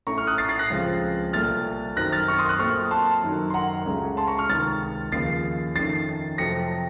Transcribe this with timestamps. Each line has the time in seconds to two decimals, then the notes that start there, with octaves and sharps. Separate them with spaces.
0.07 A2 A3 C#4 A#5 C#6
0.17 C#6 F6
0.27 D#6 F#6
0.38 A6 C7
0.49 A6 C7
0.59 F#6 A#6
0.70 C#2 C#3 F3 C4
1.33 C2 A#2 A3 F6 A6
1.97 F#2 D#3 F#3 C4 F#6 A#6
2.12 F6 A6
2.28 C#6 F6
2.39 C6 D#6
2.49 D#6 F#6
2.59 A#2 F#3 A3 C4 C#6 F6
2.91 A5 C6
3.23 F#2 D#3 F#3
3.50 C6
3.54 F#5 A#5
3.86 C#2 C#3 A3 C#4
4.17 A5 C6
4.27 A#5 C#6
4.38 C#6 F6
4.49 C#2 C3 D#3 F6 A6
5.12 D#2 C#3 F3 A6 C7
5.75 F2 D#3 A3 C#4 A6 C7
6.38 F2 C3 F#3 A3 C4 A#6 C#7